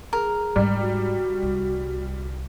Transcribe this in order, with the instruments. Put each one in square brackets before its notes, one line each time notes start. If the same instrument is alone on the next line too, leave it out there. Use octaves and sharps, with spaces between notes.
[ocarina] G#4 [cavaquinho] A#4
[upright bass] G#2 C#3 [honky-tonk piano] G3
[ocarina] F#4
[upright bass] C2